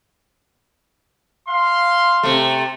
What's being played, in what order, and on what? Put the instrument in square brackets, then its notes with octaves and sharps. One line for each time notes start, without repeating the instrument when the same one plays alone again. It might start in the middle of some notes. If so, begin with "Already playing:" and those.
[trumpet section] F5 C6
[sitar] C3 A3